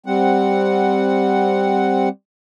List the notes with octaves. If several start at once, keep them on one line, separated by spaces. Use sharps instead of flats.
G3 C4 F#5